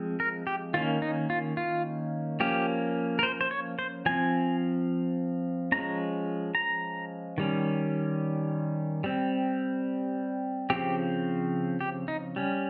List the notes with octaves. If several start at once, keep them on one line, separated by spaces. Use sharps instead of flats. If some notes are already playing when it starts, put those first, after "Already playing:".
Already playing: F3 G#3 C4
A#4
G4
D#3 A#3 C#4 F4
D#4
F4
F4
F3 A#3 C#4 G4
A#4
C5
C5
C#5
C5
F3 C4 G#5
F3 G#3 C#4 A#5
A#5
D#3 G3 C#4
G3 C4
C#3 F3 C4 G4
G4
D#4
G3 C#4